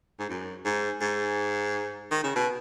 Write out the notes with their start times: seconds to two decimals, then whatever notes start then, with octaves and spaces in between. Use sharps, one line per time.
0.19 G#2
0.30 F#2
0.65 G#2
1.01 G#2
2.11 D#3
2.24 C#3
2.36 B2